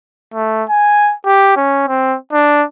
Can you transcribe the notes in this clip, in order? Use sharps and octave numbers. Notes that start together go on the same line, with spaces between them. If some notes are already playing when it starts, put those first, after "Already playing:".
A3
G#5
G4
C#4
C4
D4